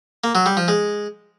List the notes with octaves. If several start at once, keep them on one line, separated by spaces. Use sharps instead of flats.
A#3
F#3
G3
F3
G#3